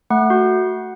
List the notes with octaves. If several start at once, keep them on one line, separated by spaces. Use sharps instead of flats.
A3 F#5
F#4